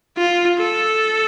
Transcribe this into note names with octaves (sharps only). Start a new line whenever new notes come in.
F4
A4